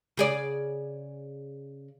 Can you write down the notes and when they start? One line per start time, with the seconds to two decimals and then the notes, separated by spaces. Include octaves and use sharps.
0.17 C#3 G#4 D5